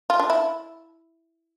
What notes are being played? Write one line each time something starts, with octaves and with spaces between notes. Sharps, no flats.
F4
D4
E4